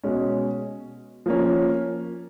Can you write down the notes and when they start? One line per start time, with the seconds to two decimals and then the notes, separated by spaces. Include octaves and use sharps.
0.03 B2 G#3 C#4
1.26 F3 A#3 C#4